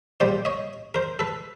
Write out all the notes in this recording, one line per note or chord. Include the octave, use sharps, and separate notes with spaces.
A#1 A#2 G3 C5 D5
C#5 D#5
A#4 C5
A4 B4